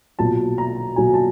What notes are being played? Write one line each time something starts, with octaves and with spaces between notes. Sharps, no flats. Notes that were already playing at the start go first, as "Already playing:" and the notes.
B1 A#2 F#3 A5
A#5
B1 A#2 F#3 G#5
A5